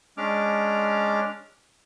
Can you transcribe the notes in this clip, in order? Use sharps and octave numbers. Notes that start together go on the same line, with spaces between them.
G#3 C#4 D4 D6 F6